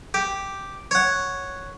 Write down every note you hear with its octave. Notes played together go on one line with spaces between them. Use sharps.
G4
C#5 F#5